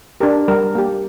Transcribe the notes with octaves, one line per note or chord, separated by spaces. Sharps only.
D4 G4 A#4
G3 A#4
A#3 G4